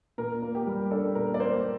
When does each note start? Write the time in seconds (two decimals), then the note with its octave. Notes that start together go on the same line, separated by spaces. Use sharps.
0.18 A#2 A#4
0.42 A#3
0.55 G4
0.67 G3
0.91 D4 A4
1.15 A#2 A#4
1.34 D5
1.40 A#3 C5